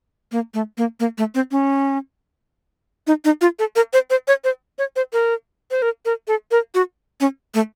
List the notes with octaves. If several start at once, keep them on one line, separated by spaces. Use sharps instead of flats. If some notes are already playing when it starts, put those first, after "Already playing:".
A#3
A3
A#3
A#3
A3
C4
C#4
D#4
D#4
F4
A4
A#4
C5
C5
C#5
C5
C#5
C5
A#4
C5
A#4
A#4
A4
A#4
F#4
C#4
A3